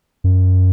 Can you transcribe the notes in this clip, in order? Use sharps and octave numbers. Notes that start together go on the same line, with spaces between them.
F#2